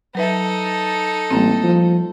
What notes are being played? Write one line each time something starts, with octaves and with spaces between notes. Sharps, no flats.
F#3 D#4 A4 B4 E5
A1 G3 A#3 C4
F3